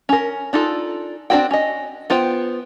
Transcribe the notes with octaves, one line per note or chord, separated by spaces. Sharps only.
C#4 A#4
D4 D#4 F4 A4
C4 D4 E4 F#4 G5
C#4 D#5
B3 F4 C5 G5